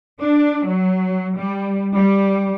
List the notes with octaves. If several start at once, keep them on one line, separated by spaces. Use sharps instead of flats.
D4
F#3
G3
G3